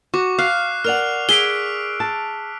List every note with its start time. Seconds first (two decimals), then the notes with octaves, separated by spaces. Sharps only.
0.14 F#4 C#6 D6
0.39 F5 F#6 C7
0.84 A#4 D5 F#5 F6 F7
1.29 G#4 E6 B6 D7 G7
2.00 A5